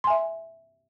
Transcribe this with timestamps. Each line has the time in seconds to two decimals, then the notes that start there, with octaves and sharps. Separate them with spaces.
0.04 C6
0.07 G#5
0.10 E5